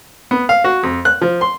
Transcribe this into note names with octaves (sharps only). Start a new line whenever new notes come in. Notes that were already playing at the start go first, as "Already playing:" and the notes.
B3
F5
F#4
F2
F#6
F3
C6